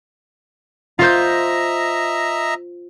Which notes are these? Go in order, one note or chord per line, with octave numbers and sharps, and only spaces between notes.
F4 C5 D#5 E5 A#5 G6